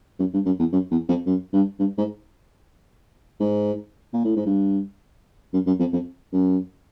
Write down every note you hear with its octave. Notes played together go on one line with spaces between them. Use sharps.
F#2
G2
F#2
E2
F#2
E2
F2
F#2
G2
G2
G#2
G#2
A#2
A2
G#2
G2
F#2
F#2
F2
F2
F#2